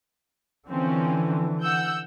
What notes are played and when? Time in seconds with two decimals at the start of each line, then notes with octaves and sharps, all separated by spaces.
0.68 D3 E3 F3 C4 C#4
1.62 F#5 E6 G6